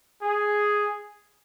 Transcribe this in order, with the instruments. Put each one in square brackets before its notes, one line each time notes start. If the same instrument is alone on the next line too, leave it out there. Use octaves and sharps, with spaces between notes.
[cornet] G#4